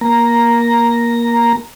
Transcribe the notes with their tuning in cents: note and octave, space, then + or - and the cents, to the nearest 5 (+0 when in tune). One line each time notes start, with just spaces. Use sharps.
A#3 +15 A#5 +0